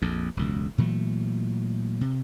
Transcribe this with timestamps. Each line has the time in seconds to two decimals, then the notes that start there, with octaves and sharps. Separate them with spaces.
0.02 A#1 F2
0.37 E1 C#2 F#2
0.78 A#2 E3 F#3 A3
2.01 C3